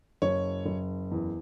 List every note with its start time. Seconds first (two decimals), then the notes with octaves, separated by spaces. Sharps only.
0.22 F#1 C#5
0.65 F#1
1.11 E2